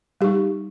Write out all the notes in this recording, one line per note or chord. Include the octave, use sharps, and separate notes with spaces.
G3 D#4 G4